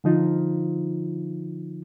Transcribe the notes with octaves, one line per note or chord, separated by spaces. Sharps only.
D3 F3 D#4 F4